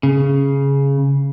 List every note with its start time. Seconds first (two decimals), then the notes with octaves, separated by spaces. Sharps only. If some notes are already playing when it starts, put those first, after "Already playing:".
0.03 C#3